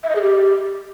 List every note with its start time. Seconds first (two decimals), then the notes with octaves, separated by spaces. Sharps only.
0.03 E5
0.09 D#5
0.16 G#4
0.22 G4